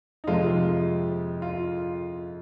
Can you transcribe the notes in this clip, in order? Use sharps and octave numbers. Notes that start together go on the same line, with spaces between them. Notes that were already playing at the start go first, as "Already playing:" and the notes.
D#4
F2 C3 F3 G#3 F4
F4